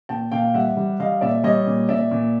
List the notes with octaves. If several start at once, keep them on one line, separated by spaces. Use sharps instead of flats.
A#2 G5 A5
A#2 F5 G5
G3 E5 F#5
G3
G3 D#5 F5
A#2 D5 E5
G3 C#5 D#5
A#2
A#2 D5 E5
A#2